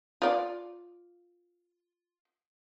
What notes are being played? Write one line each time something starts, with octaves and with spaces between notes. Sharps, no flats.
F4 D5